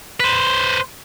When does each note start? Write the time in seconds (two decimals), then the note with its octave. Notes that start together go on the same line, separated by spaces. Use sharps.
0.20 B4 C5